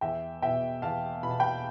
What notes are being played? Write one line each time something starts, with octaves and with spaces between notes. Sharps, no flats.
E2 E5 G5
B2 B3 E4 E5 G5
E2 F5 A5
B2 B3 E4 B5
A5
G5 B5